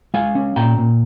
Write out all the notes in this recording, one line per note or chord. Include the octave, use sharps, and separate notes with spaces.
G#3 F5 G#5
C#4
A#2 G5 A#5
A#2